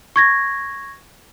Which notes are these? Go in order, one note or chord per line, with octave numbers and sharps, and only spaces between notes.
C#6 G#6 A#6